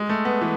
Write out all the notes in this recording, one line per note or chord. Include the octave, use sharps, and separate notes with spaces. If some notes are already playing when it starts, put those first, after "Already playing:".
Already playing: G#3
A3
B3
E3